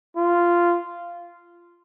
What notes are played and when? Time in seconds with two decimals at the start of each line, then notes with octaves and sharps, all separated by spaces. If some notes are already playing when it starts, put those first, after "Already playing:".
0.16 F4